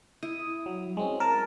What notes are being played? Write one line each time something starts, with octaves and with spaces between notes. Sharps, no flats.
E4 D#6
F#3
G#3 C4 C#4
A#4 A5